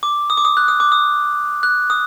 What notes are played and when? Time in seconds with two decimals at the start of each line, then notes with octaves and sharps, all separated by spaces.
0.03 D6
0.30 D#6
0.37 D6
0.45 D#6
0.57 F#6
0.68 D#6
0.80 D6
0.92 D#6
1.63 F#6
1.90 D#6